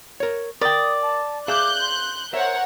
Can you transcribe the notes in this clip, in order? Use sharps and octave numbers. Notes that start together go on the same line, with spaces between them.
A#4 C#5
A#4 D5 G5 D#6
A5
G#4 E5 F5 D6 F#6 G6
C6
A#4 C5 C#5 E5 F#5